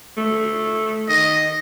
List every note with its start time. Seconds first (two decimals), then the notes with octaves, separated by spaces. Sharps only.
0.17 A3
1.09 D#3 D#5